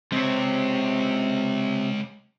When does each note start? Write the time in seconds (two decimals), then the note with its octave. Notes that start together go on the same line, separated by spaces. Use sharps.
0.12 C3 G#3 C#5